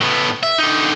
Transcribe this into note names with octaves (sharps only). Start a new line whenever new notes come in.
A2 B3
E5
D3 D#4